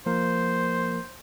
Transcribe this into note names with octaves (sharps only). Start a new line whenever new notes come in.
F3 A#3 A#4 C5